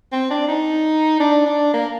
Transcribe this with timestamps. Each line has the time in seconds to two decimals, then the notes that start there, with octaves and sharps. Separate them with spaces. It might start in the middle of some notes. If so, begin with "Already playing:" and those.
0.12 C4
0.31 D4
0.48 D#4
1.20 D4
1.46 D4
1.73 A#3